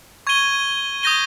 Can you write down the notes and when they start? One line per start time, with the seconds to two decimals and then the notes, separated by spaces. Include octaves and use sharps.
0.27 C#6 G#6 D#7 G7
1.03 D#6 G6 A#6 D#7 G7